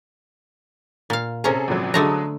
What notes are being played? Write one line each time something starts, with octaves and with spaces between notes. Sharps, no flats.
A#2 F5
C3 C#4 G#4 A4 A#5
G#1 A#2 F#3
D3 F#3 G#3 A3 A#5 D#6